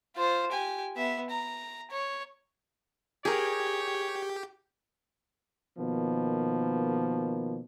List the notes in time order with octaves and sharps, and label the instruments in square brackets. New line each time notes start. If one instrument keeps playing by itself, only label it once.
[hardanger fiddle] F4 C5
G4 G#5
B3 E5
A#5
C#5
[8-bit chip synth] G4 [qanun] G#4 A#4 [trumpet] C#5
[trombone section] B2 D#3 F3 A#3 B3